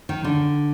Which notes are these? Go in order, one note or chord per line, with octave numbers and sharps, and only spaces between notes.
D#3
D3